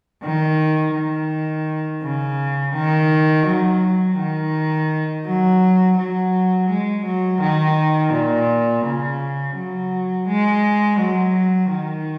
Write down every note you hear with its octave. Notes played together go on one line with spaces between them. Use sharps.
D#3
D#3
C#3
D#3
F#3
D#3
F#3
F#3
G#3
F#3
D#3
A#2
C#3
F#3
G#3
F#3
D#3